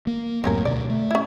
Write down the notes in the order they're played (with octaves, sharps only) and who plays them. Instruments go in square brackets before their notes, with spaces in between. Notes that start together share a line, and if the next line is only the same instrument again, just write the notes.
[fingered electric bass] A#3
[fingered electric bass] D1 F#2 A2 [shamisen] C4 C#4 A#4
[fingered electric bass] D2 B2 [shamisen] D5
[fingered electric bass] A3
[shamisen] C#4 E4